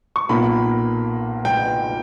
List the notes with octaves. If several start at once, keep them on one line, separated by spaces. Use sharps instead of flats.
C#6
B1 A#2 A#3 B5
G5